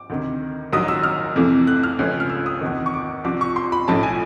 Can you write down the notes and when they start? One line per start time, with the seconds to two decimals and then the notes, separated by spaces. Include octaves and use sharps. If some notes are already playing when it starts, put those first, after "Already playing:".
Already playing: D6
0.10 D2 C3 D#3
0.72 A#1 G#2 D#3 F#3 D#6
0.88 E6
1.04 F6
1.36 F2 C3 E3 A3
1.67 F#6
1.83 F6
1.99 C#2 C#3 F3 A3 C#4
2.20 F6
2.30 E6
2.46 D#6
2.61 E2 C3 D#3
2.86 C#6
2.94 D6
3.24 C2 C3 F3 D6
3.41 C#6
3.56 C6
3.72 B5
3.88 B1 A2 F3 A3 C#4 A5
4.03 G#5